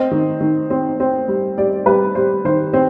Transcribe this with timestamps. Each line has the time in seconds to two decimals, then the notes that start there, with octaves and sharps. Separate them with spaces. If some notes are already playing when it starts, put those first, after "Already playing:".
Already playing: C4 D#5
0.11 D#3
0.41 D#3
0.70 C4
1.00 C4
1.28 G3
1.58 G3 D5
1.86 G3 B4
2.15 G3 C5
2.45 D#3 C5
2.73 C4